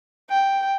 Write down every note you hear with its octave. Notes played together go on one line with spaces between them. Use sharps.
G5